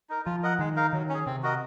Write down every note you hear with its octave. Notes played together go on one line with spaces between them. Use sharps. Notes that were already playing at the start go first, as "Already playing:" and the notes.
D#4 A#4
F3 F4
A#4 D#5 F#5
D#3 G#3
D#4 A#4 F5
D#3 F#3
C#4
G#4
C3 C4
F#4 A#4 D#5